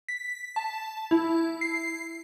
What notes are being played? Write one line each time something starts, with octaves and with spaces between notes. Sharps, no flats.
B6
A5
E4
C7